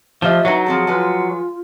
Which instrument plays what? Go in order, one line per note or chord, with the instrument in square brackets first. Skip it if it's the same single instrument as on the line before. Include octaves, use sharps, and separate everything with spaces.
[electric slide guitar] F3 [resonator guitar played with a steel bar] A3 G4 D#5 [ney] E5
[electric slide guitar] F#3 [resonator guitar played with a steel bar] D#4 E4 B4
[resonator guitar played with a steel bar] F3 C4 A4 [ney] G#4
[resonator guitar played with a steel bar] F3 G#3 B4 [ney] F4